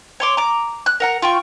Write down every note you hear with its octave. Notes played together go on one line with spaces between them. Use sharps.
C#5 C6 D6
A#5 D6
F#6
A#4 F#5 A#5
F4 G5 C#6